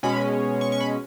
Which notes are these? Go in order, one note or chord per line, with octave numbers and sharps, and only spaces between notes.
B2 G#3 C#4 B5
C#6
C#6
B5